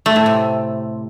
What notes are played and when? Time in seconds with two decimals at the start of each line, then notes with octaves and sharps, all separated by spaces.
0.06 A3
0.16 A2
0.26 C3